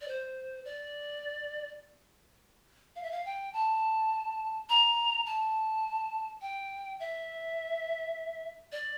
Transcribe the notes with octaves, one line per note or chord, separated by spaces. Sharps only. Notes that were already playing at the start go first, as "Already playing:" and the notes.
D5
C5
D5
F5
E5
F5
G5
A5
A#5
A5
G5
E5
D5